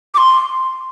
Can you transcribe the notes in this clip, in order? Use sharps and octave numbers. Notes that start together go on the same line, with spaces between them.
D6
C6